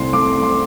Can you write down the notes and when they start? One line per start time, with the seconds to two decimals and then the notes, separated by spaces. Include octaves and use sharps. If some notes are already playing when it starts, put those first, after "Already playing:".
Already playing: C2 C3 A3 C6
0.13 A3 D6
0.36 A3
0.43 C6